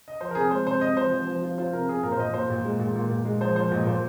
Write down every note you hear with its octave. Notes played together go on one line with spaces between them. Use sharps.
D#5
F3 C5
A#4
C3 G#4
G#3 C5
C3 C5
C3 D#5
F3 C5
F3
F3
F4
F4 C5
C3 A#4
C3 G#4
A#2 A#4
C5
A#2 D#5
A#2 C5
A#2
G#3
A#2
A#2
A#2
G#3
F3 C5
F3 C5
A#2 D#5
A#2 C5